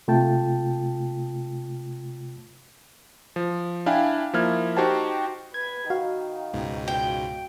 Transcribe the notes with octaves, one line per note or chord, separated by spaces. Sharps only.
C3 A3 F4 G5 A5
F3
D4 E4 F5 G5 G#5
F3 A#3 E4 F6 G#6
D#4 F#4 G4 C5 G5 A5
B4 G#6
D#3 F#4 F5
C#2 G#2 B2
G5